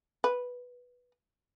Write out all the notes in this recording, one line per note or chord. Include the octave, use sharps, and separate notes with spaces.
B4